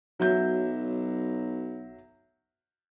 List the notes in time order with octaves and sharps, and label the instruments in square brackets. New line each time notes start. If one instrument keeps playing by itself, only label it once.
[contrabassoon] B1 [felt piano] F#3 E5 G6